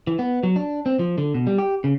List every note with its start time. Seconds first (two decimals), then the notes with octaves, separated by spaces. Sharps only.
0.07 E3
0.19 B3
0.43 F#3
0.56 D4
0.86 C4
0.99 F3
1.18 D3
1.34 B2
1.47 G3
1.58 G4
1.84 C#3